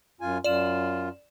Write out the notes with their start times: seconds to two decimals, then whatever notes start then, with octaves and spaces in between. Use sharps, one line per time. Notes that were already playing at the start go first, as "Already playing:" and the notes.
0.21 F#2 F4 G#5
0.44 F#2 F4 D5 E7